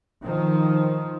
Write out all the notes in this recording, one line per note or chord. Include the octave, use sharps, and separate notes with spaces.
D#3 F3